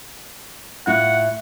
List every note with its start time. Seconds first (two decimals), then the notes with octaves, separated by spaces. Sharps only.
0.87 A2 E4 F4 F#5